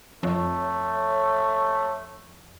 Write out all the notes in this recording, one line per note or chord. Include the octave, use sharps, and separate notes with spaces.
F2 A3 C#5